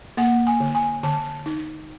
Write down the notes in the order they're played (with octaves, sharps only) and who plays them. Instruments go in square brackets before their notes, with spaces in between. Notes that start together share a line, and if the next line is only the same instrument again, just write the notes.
[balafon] A#3 F#5
G#5
D3
G#5
D3 A5
D#4